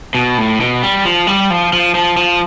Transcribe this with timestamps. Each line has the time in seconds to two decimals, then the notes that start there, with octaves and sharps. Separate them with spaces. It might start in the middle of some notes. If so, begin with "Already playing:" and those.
0.15 B2
0.38 A2
0.61 B2
0.83 G3
1.05 F3
1.27 G3
1.50 F3
1.73 F3
1.95 F3
2.17 F3